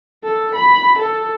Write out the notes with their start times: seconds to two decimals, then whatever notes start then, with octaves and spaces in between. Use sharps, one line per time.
0.24 A4
0.55 B5
0.99 A4